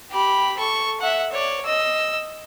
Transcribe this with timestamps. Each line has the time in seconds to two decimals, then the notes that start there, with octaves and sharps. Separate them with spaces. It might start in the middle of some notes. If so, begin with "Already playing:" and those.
0.11 G4 B5
0.58 A4 C#6
1.01 E5 F#5
1.33 C#5 D5
1.65 D#5 E6